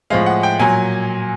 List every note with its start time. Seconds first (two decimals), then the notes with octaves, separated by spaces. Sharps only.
0.10 A2 F3 G#3 F5
0.26 F#5
0.43 G5
0.59 A#2 F#3 G#5